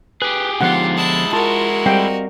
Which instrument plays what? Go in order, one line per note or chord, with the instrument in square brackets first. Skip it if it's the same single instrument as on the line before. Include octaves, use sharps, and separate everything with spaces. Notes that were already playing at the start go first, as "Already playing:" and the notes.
[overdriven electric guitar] G4 G#4 [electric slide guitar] B4
[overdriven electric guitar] G#2 F4 [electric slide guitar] D3 F3 B3 [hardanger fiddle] G4 [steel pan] F#5
[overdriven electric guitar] G#3 E4 [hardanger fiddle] A5
[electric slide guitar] F4 [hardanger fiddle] F#4 A#4 [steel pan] A5
[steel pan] G3 G5 [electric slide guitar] C4 D#5 F5